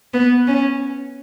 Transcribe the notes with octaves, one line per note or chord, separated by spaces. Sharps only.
B3
C#4